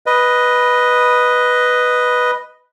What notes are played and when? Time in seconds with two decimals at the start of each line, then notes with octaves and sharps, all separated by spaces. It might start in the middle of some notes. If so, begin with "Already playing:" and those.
0.06 B4 D#5